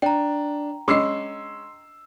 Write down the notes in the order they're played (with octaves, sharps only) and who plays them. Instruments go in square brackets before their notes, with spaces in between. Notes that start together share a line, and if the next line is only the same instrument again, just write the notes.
[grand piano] D4 [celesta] G5 A#5
[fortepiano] G#3 C#4 D6 [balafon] D4 D#5 [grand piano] C6 E6 C7